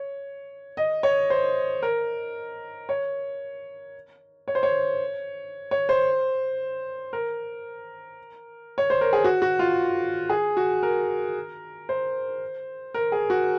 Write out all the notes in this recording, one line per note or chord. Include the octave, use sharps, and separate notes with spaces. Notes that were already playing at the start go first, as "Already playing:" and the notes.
Already playing: C#5
D#5
C#5
C5
A#4
C#5
C#5
C5
C#5
C#5
C5
A#4
C#5
C5
A#4
G#4
F#4
F#4
F4
G#4
F#4
A#4
C5
A#4
G#4
F#4